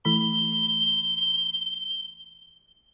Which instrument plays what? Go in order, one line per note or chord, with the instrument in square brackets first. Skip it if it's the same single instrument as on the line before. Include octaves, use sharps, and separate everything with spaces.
[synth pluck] E3 A3 B5 [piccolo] G7